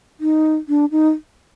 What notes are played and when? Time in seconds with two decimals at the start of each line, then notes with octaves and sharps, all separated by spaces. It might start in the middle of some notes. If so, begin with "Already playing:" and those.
0.20 D#4
0.69 D4
0.91 D#4